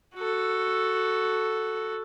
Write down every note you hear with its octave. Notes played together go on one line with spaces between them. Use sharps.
F#4 A4